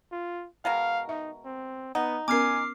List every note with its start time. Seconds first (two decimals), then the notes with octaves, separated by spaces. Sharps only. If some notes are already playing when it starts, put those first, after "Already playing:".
0.12 F4
0.65 B2 G#3 A#4 F5
1.09 D#4 E5
1.45 C4
1.95 B3 D#4 F#5
2.28 B3 C#4 A#4 G#5 D6 F6 C7